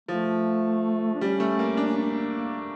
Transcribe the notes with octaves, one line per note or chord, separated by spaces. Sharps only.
F3 A3
D4
G3 C#4
A3
A#3
D4
A#3